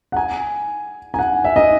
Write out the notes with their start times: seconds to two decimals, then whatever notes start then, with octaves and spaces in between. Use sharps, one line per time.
0.12 F#5
0.16 G#5
1.14 G#5
1.19 F#5
1.44 E5
1.56 D#5